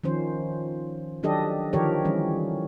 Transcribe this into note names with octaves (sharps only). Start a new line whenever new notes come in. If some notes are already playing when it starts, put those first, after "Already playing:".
D#3 F3 C#4 C5
D#3 F#3 D4 G4 A4 D#5
D3 D#3 F3 G4 A#4 C#5
E3 G3 C#4